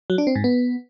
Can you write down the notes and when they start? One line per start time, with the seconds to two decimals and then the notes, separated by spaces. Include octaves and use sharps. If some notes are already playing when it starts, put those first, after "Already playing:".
0.10 F#3
0.18 D4
0.27 C4
0.35 G#2
0.44 B3